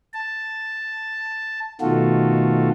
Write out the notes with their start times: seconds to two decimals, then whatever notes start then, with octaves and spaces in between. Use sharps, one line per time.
0.14 A5
1.81 B2 D#3 A3 F4 F#4 A4